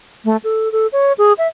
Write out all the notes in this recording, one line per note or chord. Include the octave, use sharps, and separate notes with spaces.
A3
A4
A4
C#5
G#4
E5